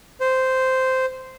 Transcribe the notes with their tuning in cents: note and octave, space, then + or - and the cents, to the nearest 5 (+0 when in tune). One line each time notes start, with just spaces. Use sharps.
C5 -10